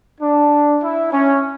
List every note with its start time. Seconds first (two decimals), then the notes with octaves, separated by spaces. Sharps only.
0.21 D4
0.82 E4
1.12 C#4